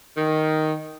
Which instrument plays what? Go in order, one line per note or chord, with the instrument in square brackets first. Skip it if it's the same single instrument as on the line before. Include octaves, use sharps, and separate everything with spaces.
[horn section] D#3